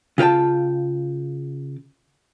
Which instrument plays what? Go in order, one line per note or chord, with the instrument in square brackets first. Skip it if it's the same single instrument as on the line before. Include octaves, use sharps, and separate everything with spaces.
[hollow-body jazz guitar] C#3 F4 A#4 G5 A5